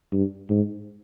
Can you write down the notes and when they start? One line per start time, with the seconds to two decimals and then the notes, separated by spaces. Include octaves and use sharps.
0.12 G2
0.49 G#2